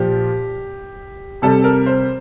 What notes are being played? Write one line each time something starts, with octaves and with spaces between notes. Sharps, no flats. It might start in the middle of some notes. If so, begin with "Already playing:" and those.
Already playing: A#2 F3 G4
C3 G3 A4
A#4
C5